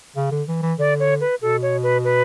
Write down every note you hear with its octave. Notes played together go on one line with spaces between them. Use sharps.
C#3
D3
E3
E3
D3 D5
C#5
B4
B2 A4
C#5
B4
B4